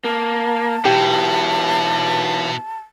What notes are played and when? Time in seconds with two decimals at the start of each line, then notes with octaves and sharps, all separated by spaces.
0.05 A#3 A5
0.85 B2 E3 F#3 G4